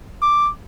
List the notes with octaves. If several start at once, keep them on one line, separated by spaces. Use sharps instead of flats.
D6